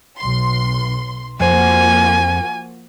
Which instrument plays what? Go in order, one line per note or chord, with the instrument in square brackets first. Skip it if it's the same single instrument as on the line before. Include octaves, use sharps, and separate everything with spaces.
[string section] B1 C6
[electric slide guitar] F2 C5 [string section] F3 A#3 F#4 [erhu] G#5